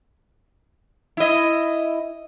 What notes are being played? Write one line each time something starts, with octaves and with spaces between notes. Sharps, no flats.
E4 D#5